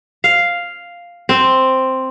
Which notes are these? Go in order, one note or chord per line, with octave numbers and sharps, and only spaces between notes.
F5
C4